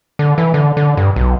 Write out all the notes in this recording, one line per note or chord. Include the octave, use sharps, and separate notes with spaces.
D3
E3
D3
D3
G2
B1